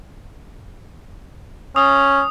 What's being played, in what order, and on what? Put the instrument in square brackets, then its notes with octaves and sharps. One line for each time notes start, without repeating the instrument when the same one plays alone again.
[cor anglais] C#4 [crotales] D#6